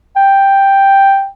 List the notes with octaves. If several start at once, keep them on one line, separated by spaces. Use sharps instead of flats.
G5